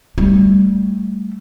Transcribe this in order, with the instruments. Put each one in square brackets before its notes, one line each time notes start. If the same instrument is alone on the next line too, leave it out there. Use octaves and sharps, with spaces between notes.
[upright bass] G3 A3